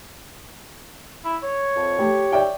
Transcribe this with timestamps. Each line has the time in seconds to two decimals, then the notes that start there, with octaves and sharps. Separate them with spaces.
1.24 E4
1.43 C#5
1.76 F2
1.99 A3 G4
2.32 D5 E5 G5